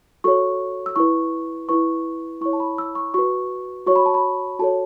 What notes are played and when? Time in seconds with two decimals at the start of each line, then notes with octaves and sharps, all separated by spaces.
0.24 F#4 A4 C#5 C#6
0.86 E6
0.96 E4 B4 C#6
1.69 E4 B4 C#6
2.41 E4 C#6
2.46 C#5
2.53 A5
2.60 B5
2.78 E6
2.95 C#6
3.14 F#4 B4 C#6
3.87 F#4 C#5 C#6
3.96 B5
4.06 A5
4.14 B5
4.59 F#4 A4 C#5 A5